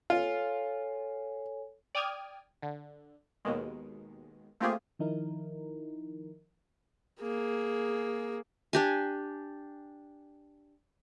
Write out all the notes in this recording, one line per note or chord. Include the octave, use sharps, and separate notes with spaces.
F4 A4 C#5 G#5
D5 G5 D#6 F6 G#6
D3
D#2 B2 D#3 G#3
A3 A#3 C4 F4 G4 G#4
D#3 F3 D#4 E4 A#4
A#3 G#4
D4 G4 G#5